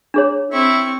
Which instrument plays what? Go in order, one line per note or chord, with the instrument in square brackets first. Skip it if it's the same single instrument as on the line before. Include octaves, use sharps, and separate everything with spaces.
[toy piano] D4 G#4 C#5
[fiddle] C4 C#6 [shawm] E4